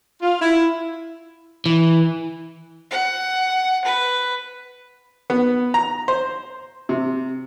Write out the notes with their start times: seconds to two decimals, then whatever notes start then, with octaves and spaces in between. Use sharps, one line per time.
0.22 F4
0.40 E4
1.66 E3
2.91 F#5
3.85 B4
5.30 B3
5.74 A#5
6.08 C5
6.89 C3